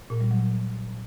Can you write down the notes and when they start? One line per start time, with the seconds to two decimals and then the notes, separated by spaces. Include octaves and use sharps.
0.10 A#2
0.21 G3
0.31 F#3